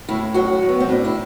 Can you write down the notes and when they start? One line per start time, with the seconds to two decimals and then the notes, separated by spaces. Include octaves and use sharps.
0.09 A2 E4
0.34 F#3 F#4
0.62 A2
0.69 B3
0.80 C4
0.89 A2 D4
1.05 E4